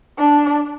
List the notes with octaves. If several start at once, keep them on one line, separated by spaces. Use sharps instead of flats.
D4